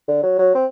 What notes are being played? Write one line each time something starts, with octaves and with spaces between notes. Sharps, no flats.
D3
F#3
F#3
C4